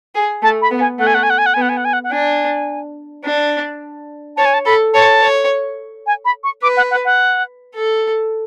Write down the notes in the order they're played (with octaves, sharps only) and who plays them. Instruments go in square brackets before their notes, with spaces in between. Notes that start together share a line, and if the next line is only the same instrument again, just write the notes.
[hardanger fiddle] G#4
[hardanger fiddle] A3 [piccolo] A5
[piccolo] B5
[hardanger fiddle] B3
[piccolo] G#5
[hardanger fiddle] A3 [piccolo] F#5
[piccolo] G#5
F#5
G#5
F#5
G#5
F#5
[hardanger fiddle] B3 [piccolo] G#5
[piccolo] F#5
G#5
F#5
G#5
F#5
F#5
[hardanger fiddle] D4 [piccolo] G#5
[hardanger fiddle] D4
[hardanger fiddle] C#5 [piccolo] A5
[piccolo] G#5
A5
[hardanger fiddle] A4 [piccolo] B5
[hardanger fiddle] C#5 [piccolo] A5
[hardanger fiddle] C#5
[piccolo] G#5
B5
C#6
[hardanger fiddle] B4 [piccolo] D6
[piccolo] F#5
F#5
F#5
[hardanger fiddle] A4